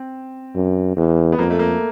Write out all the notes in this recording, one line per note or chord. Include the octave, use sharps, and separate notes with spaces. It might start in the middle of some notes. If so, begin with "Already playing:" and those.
Already playing: C4
F#2
E2
B3
F2 A#3
A3
A#3